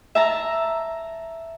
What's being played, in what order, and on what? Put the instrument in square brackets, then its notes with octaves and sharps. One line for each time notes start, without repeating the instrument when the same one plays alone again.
[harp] E5 A5 A#5